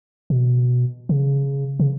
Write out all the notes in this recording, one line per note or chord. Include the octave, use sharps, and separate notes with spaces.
B2
C#3
C#3